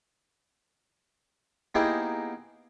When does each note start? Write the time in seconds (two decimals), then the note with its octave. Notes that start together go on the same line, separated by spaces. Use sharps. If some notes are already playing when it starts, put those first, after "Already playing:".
1.75 A#3 B3 D#4 E4 G4 G#4